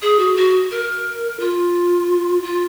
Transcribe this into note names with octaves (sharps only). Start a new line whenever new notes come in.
G#4
F#4
F#4
A#4
F4
F4